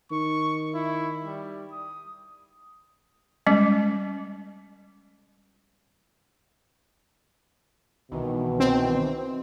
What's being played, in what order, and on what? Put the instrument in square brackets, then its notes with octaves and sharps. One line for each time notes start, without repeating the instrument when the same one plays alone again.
[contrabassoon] D#3 [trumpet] C#6
[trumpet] E4
G3
D#6
[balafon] G3 G#3 C#4
[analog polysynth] C2 D#3 E3 [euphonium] B2
[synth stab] C4